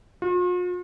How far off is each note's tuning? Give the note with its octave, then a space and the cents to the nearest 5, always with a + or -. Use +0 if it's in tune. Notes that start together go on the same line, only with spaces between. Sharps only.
F4 +45